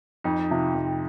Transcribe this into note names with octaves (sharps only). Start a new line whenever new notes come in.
F2 D#4
C3 F3
F2